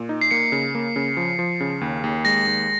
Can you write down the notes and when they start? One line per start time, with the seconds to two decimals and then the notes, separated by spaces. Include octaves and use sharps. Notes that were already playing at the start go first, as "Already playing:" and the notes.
Already playing: A#2
0.09 D#4
0.21 C7
0.31 A#3 C#7
0.52 C#3
0.75 A#3
0.96 C#3
1.17 F3
1.39 F3
1.60 C#3
1.81 D#2
2.04 D#2
2.25 G#3 A#6
2.47 D#2